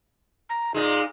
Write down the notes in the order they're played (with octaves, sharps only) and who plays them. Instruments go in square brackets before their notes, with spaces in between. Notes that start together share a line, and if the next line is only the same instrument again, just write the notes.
[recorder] A#5
[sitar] A#2 G#3 [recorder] D#4